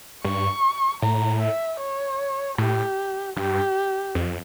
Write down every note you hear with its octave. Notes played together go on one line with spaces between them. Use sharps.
G2 C#6
A2 A#5
E5
C#5
A2 G4
G2 G4
F2